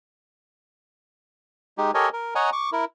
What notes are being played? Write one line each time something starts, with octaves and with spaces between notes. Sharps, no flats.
G#3 D#4 G4
G4 A4 A#4 C#5 D#5 G#5
A#4
C#5 D#5 F#5 G#5 A#5
C#6 D6
E4 A#4